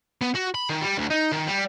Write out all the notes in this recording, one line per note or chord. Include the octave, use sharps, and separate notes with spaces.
B3
F#4
B5
D#3
G3
D2
D#4
D#3
G3